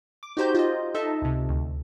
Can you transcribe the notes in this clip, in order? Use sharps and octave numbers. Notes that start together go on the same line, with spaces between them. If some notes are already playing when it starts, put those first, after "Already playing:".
D6
D#4 F#4 G4 C5 A#5 G6
F4 C5 D#5
D#4 A4 D#5 E5 A5
C#2 C3
D2